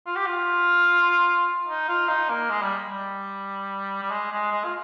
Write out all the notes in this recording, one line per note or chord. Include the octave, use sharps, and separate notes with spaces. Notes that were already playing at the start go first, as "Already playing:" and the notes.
F4
G4
F4
D#4
F4
D#4
A#3
G#3
G3
G3
G3
G#3
G#3
G#3
F4